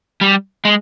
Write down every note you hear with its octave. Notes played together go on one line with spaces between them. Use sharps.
G3
G#3